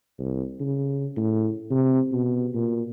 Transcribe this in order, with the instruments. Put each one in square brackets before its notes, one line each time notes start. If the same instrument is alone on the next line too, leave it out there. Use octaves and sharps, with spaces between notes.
[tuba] C2
C#3
A2
C3
B2
A#2